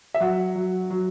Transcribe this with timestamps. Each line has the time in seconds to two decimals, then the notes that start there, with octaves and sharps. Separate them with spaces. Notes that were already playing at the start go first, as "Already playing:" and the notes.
0.14 E5
0.20 F#3 F#5
0.55 F#3
0.90 F#3